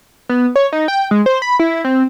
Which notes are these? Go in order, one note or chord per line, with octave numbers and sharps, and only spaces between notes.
B3
C#5
D#4
G5
G#3
C5
B5
E4
C4